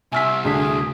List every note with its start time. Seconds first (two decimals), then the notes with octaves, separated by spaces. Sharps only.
0.12 C2 E5 G#5 F6 B6
0.44 D2 D4 G#4 B6